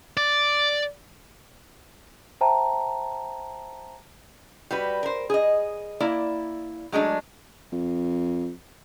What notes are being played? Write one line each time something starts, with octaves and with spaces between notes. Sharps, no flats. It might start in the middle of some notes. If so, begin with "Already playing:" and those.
D5
C5 E5 G5 A5 A#5
G3 F#4 B4
A#4 C5
G#4 D#5
A#3 E4 D5
F#3 G#3 A3 D4
F2